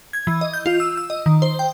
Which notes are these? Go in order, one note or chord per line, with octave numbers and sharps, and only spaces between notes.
G#6
E3
D#5
G6
F4
E6
E6
D#5
D#3
C5
G5